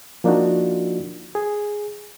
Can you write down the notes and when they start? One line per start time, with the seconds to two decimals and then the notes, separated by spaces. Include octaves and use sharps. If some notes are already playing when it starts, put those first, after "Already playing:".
0.24 F3 A#3 D4 D#4 F4 F#4
1.35 G#4